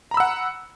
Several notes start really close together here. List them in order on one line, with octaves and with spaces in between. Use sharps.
A#5 B5 E6 F#5